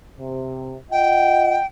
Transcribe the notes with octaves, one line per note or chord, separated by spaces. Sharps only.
C3
F4 D#5 F#5 G5